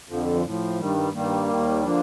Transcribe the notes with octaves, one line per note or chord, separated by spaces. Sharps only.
F2 D3 F3
F3
A2 F3
G2 D#3 G3
G3
G2 D#3 G3 A#3
D#2 D#3
D3 F3 A#3 D4